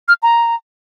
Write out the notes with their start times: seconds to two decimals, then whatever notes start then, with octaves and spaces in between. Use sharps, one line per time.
0.08 F6
0.23 A#5